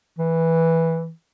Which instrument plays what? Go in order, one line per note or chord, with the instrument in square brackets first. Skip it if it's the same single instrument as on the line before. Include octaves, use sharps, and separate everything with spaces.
[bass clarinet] E3